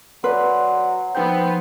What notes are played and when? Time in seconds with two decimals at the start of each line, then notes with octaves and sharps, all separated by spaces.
0.24 F#3 B4 D5 C6
1.15 F3 B3 C4 D#4 G6